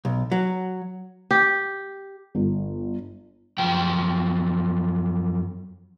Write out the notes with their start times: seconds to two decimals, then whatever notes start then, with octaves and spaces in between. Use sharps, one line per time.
0.05 B1
0.32 F#3
1.31 G4
2.35 G1
3.58 F#2 F3 G5